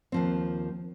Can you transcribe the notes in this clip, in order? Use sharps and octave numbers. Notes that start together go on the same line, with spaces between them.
D#2 F3 C4